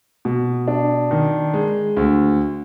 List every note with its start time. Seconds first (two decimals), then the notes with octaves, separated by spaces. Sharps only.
0.25 B2
0.68 D4
1.11 D#3
1.54 G#3
1.97 D2